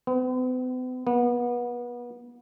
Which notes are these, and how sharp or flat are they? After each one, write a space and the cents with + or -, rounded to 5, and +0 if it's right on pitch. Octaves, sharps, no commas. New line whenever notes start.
B3 +45
B3 -30